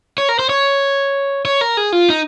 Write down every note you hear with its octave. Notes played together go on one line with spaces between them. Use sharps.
C#5
A#4
C5
C#5
C#5
A#4
G#4
F4
D#4